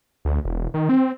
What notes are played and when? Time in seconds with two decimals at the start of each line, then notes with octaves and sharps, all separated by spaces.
0.25 D2
0.45 E1
0.74 D#3
0.89 C4